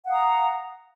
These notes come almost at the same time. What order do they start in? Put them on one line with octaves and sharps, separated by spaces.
F#5 F5 D#6 A#5